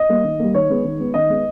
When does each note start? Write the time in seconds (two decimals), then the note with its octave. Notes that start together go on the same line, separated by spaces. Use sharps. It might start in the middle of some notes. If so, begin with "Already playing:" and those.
Already playing: D#5
0.09 G3 A#3
0.24 D#3
0.39 G3 A#3
0.54 D#3 C#5
0.70 G#3 B3
0.84 D#3
0.99 G#3 B3
1.14 D#3 D#5
1.30 G#3 B3